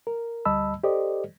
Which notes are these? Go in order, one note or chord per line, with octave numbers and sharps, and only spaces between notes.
A#4
D2 G3 D#5 A5 B5 E6
G4 A4 C5 D5 D#5